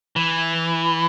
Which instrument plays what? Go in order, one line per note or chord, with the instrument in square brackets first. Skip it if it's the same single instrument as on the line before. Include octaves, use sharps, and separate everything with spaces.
[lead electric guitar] E3